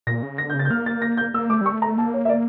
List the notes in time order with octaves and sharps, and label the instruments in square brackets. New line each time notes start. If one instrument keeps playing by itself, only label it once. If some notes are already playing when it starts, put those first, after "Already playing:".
[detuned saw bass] A#2 [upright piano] A#6
[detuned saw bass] C#3
[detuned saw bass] D3 [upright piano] A#6
[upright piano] G6
[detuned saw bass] C#3
[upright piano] A6
G6
[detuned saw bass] A#3 [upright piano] F6
[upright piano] A6
A#6
G6
[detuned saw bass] A#3 [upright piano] E6
[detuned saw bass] A3 [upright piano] D6
[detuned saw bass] G3 [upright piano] C#6
[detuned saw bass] A3
[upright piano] A#5
[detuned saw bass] A#3 [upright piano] A5
[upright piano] C#5
E5
D5